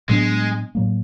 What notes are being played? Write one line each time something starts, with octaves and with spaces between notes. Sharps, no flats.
A2 F#3 G#3 B3 D4
A2 F#3 A#3